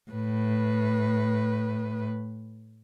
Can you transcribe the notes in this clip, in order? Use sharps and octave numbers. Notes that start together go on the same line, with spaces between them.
A2 B4